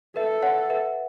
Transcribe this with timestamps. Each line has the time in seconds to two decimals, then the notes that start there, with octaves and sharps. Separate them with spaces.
0.16 A4 B4 E5
0.43 C#5 F#5
0.70 B4 E5